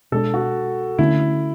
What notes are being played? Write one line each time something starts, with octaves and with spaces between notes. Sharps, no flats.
B2 G#3 D4 A4
F#4
D3 A3 C#4 E4